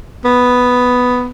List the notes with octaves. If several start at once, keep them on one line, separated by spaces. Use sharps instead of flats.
B3